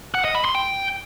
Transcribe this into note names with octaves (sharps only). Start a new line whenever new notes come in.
F#5
D#5
B5
C6
G5